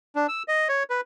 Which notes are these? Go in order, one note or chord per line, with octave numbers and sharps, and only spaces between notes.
D4
E6
D#5
C#5
B4